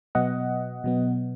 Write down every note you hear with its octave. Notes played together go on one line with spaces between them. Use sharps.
B2 F#3 B3 D#5 F#5
B2 F#3 B3